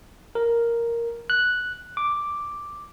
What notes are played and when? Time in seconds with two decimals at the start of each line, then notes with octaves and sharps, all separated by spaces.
0.35 A#4
1.30 F#6
1.97 D6